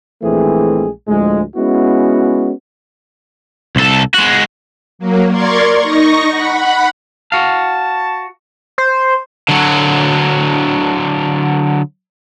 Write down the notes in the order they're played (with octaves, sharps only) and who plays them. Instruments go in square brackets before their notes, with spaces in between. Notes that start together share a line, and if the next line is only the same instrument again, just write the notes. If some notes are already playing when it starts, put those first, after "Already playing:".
[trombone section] A#1 E3 G#3 A3 C4 G#4
D2 A2 F3 G#3
G#3 B3 C#4 E4 F#4
[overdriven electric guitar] C2 A4
G#3 F#4
[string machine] F#3 A#3
A#4 D5 C6 C#6 G#6
D#4 C#6 A#6
F#5 B5
[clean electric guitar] F#4 F5 [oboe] A5
[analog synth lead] C5
[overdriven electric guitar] D3 F#3